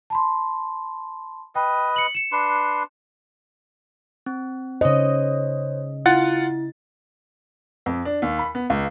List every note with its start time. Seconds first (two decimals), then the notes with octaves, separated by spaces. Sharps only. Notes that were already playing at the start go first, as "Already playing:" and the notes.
0.10 A5 B5 C6
1.55 B4 D#5 G5
1.96 C#7 F#7
2.15 C#7 E7
2.32 D4 B4 C6
4.26 C4
4.81 C#3 C5 C#5 D#5
6.06 E4 F4 F#5 A6
7.86 F2
8.05 D4
8.22 D#2
8.39 B5
8.55 B3
8.70 C#2